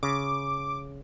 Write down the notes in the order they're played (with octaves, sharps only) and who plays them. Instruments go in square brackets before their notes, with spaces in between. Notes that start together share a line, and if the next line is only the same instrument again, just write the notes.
[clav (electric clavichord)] C#3 [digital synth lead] D6